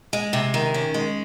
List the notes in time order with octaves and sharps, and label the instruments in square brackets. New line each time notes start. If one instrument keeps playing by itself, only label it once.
[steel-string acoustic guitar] G#3
C3
D#3
C#4
G#3